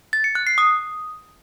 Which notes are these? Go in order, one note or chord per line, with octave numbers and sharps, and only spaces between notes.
A6
C#7
F#6
C7
D#6